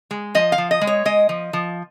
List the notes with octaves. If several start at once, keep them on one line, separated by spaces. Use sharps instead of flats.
G#3
F3 D#5
F5
F3
D#5
G#3
C#5
G#3 D#5
F3
F3